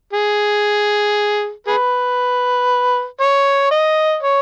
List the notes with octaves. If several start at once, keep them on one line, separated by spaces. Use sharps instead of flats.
G#4
G#4 B4
C#5
D#5
C#5